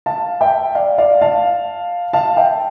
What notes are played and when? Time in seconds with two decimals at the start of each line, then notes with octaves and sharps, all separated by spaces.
0.06 F5 A5
0.41 E5 G5
0.75 D5 F5
0.98 D5 F5
1.21 F5 A5
2.13 F5 A5
2.37 E5 G5